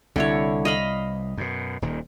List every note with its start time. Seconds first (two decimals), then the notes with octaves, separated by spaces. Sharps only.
0.16 C2 D3 E4 C#5
0.65 D#5 F5 B5
1.37 F#2 B2
1.82 D#1 A#2 D#3